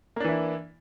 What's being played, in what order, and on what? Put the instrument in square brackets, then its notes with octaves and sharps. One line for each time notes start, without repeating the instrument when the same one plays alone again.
[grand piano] A#3
D4
E3
E4